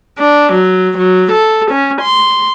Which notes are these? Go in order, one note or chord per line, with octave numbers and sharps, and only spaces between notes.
D4
F#3
F#3
A4
C#4
C6